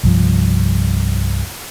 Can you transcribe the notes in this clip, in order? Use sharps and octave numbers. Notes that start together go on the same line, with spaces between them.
C2 G2 F3